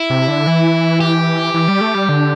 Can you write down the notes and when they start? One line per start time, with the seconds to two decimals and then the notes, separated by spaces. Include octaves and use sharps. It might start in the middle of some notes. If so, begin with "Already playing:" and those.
Already playing: E4
0.10 C3
0.28 D3
0.47 E3
1.00 G4
1.54 E3
1.68 G3
1.81 A3
1.95 G3
2.09 D3